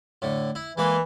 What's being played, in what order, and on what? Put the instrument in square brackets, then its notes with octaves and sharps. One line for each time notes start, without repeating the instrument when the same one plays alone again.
[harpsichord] A2 D3
E4
[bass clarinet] E3 [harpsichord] G#3 A#3 B4